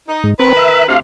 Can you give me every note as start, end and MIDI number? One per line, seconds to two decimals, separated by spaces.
0.08 0.30 63
0.24 0.34 44
0.40 0.87 51
0.40 0.53 60
0.40 0.87 70
0.40 0.87 71
0.57 0.84 76
0.88 0.98 38
0.88 0.98 48
0.88 1.00 77